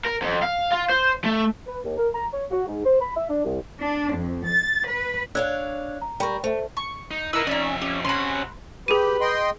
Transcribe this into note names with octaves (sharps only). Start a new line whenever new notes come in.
A#4
F2
F5
F4
C5
A3
B4
D#2
A#4
A#5
C#5
F#4
G#2
C5
B5
E5
D4
C2
D4
F2
A6
B4
D4 C#5 F5 E6 F#6 G#6
A#5
G3 A#4 G5 B5 C#6
A3 C5 E5
C#6
D#4
E4 A#4 B4 D#5 E6
F2 C#4 D#4 D5 E5
C#4 G4
C3 C#4 F#4 B5 C6
G4 G#4 B4 D#7
D#5 G5 C6